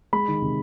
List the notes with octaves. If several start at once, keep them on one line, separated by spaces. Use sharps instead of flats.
G#3 B5
D#3
C3